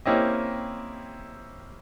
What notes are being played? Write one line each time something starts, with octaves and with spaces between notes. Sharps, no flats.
A#3 C4 C#4 E4 G4 D#5